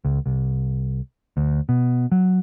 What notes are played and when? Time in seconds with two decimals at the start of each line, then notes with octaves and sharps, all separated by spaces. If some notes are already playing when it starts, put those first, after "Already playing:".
0.05 C#2
0.26 C2
1.37 D2
1.69 B2
2.12 F#3